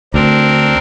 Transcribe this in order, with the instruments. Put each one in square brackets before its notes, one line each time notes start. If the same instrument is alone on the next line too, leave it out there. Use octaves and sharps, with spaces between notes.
[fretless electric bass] D2 [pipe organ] C4 D4 A#4